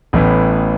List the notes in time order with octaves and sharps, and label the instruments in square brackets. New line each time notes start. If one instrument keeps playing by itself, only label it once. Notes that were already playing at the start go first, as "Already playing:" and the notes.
[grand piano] A1 A2 E3 B3